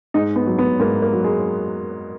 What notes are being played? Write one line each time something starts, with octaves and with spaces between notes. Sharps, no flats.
G#2 D#4
B3
F#3
B3
G#2 A#3
A#3
F#3
G#3